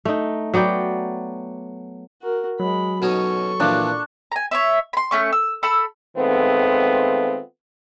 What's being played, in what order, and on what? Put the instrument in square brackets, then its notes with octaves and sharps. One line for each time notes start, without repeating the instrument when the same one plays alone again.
[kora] A3 D#4
F#3 B3 D5 G5
[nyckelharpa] F#4 A#4
[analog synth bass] F#3 [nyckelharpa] G#3 B5
[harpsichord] B2 C#4 D#4 [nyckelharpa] A4 C#6
[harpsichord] A#2 E3 F3 [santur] D4
[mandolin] G#5 A#5
C#5 D5 E5
B5 C6
A3 C#4 C#6
E6
A4 B5 E6
[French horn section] D#3 G#3 A3 B3 C4 F4